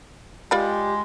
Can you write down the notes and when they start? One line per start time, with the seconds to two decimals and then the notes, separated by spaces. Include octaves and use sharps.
0.51 G#3 F4 G4 D5 B5